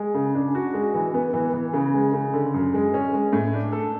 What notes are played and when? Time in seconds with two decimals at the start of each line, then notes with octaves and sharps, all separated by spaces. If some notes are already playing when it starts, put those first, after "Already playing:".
Already playing: G#3
0.14 C#3
0.35 D4
0.55 F#4
0.74 G#3
0.94 E3
1.14 B3
1.33 E3
1.53 E3
1.73 C#3
1.94 G#3
2.13 C#3
2.33 D3
2.54 F#2
2.74 G#3
2.94 C#4
3.14 G#3
3.33 A2
3.54 D4
3.73 A4